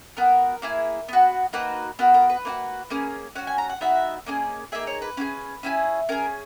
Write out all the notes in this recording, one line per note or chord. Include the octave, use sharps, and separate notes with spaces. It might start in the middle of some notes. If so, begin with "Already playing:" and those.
B3 F#4 A#4
A#3 E4 G#4
B3 F#4
A#3 D#4 F#4 B4
B3 F#4 A#4
A#4
B4
A#3 D#4 F#4
A#3 C#4 G#4
C#4 F#4 F#5
G#5
A#5
F#5
B3 D#4 F#4 E5
A#3 C#4 G#4 D#5
A#3 D#4 G#4 E5
C#5
B4
C#4 E4 G#4
C#4 E4 G#4
C#4 G#4 A#4